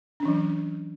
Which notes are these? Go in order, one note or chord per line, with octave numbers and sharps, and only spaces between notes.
E3 F#3 C#4 D4